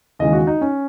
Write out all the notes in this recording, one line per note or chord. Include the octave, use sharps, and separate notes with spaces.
D#2 C#3 E3 G#3 D#5
F#4
D#4
C#4